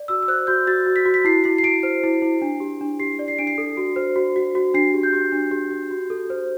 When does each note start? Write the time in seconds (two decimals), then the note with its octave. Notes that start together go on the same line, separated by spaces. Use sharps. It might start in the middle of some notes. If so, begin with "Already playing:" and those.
Already playing: D5
0.08 F#4 E6
0.23 E6
0.28 C5 F#6
0.47 F#4 G6
0.67 F#4 A6
0.87 F#4
0.96 B6
1.05 F#4
1.14 B6
1.25 E4 C7
1.44 E4 C7
1.58 C7
1.63 E4 D7
1.83 C5
2.03 E4
2.22 E4
2.42 D4
2.60 G4
2.81 D4
2.99 G4 C7
3.19 D5
3.28 C7
3.38 D4 D7
3.47 C7
3.58 A4
3.77 F#4
3.96 C5
4.16 F#4
4.36 F#4
4.55 F#4
4.74 D4 C7
4.94 G4
5.03 G6
5.13 G4
5.32 D4
5.51 G4
5.71 G4
5.91 F#4
6.10 A4
6.30 C5